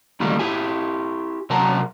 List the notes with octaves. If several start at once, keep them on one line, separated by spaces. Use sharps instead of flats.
C#2 D#3 E3 G3 A3 A#3
E4 G4 G#5
C3 F#3 A#4 F#5 A5 A#5